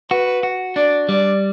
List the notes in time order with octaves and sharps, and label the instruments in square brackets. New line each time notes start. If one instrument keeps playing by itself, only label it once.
[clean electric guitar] F#4 [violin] B4
[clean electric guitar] F#4
[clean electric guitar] D4 [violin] D5
[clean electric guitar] G3 [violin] D5